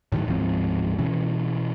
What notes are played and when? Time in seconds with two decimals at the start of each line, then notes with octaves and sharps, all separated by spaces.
0.12 A2 D#3 E3 F#3
0.27 D1 G#2 F3 C4
0.98 B2 E3 C#4